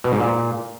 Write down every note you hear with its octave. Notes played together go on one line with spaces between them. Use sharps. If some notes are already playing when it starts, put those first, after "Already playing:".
B2
G#2
A#2